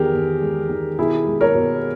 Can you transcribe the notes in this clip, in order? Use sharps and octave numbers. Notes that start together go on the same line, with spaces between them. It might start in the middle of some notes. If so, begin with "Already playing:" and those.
Already playing: E2 D#3 G4 G#4 A#4
E2
G#3
D#3
B2 E4 G#4
G#3
A#4 C#5
B2